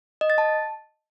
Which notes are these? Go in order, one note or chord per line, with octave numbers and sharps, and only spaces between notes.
D#5
A6
A5